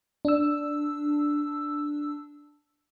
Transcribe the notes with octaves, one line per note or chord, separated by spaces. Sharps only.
D4 E6